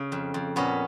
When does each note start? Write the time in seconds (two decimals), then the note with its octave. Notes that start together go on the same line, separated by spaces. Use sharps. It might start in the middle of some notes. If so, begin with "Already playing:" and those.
Already playing: C#3
0.12 F2
0.34 F2
0.56 A#2 B3 C#4